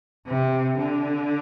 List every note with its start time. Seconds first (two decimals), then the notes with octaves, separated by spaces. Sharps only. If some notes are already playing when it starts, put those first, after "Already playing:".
0.27 C3
0.79 D3